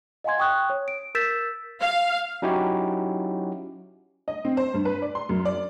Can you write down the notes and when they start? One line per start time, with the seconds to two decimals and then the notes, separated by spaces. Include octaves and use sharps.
0.24 D#5 F5 F#5 G#5 C6 G#6
0.39 G5 C#6 D#6 F#6
0.70 C#5
0.88 D7
1.15 A#4 E6 G6 A6 B6 E7
1.80 F5
2.42 F#3 C#4 D#4 E4 F#4 G4
4.28 D#5
4.45 C4
4.57 C5
4.74 G2
4.85 B4
5.02 D5
5.15 C6
5.29 F#2
5.45 D5